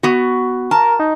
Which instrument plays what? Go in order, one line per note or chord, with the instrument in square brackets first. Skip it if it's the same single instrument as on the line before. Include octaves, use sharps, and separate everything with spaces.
[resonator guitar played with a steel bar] B3 F#4
[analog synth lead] A#4 [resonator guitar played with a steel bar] A5
[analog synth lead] D#4